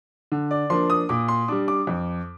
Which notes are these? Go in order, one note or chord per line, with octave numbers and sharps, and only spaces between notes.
D3
D5
F3 A#3 D4 C6
D#6
A#2 D6
C6
G3 D4 D6
D6
F2